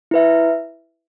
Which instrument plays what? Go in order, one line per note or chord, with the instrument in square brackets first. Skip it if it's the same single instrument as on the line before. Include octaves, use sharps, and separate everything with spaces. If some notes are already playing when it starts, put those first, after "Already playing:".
[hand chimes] E4 B4 E5